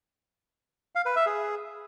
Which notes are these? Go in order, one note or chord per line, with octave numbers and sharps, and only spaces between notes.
F5
B4
E5
G#4